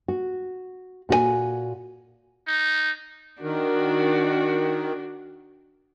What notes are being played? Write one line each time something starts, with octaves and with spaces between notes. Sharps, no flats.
F#4
A#2 F#4 G#4 G#5
D#4
D#3 D4 F#4